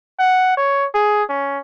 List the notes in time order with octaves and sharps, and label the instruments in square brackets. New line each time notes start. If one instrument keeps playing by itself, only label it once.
[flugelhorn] F#5
C#5
G#4
C#4